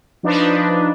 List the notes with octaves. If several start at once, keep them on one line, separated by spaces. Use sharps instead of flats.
F3 D4 D#4 B4